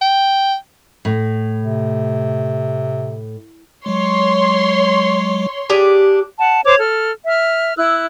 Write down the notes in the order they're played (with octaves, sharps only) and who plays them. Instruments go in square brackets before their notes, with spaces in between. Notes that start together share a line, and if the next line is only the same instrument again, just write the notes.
[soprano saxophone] G5
[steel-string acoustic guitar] A2
[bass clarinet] C3
[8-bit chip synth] F#3 G#3 [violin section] C#5 C6
[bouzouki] D4 G4 G#4
[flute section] F#5 A5
C5 C#5 D6
A4 F6
E5 F6
E4 E6 F#6